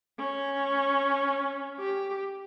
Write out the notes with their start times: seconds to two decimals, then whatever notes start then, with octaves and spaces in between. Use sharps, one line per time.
0.19 C#4
1.79 G4